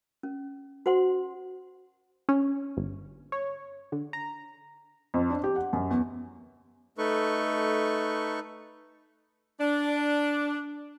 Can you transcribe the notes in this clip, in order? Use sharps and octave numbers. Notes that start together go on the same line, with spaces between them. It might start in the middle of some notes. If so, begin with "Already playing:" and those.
C#4
F#4 C5 F#5 C6
C#4
G1
C#5
D3
A#5
F2
D4
G4
F#5
F#2
E2
A3 D#4 A4 B4 C#6
D4